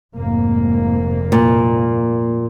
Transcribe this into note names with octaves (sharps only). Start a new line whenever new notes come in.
F1 G#2 A#3
A#2